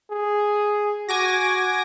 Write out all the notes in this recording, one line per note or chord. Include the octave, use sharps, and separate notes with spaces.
G#4
F#4 G#5 D6 A#6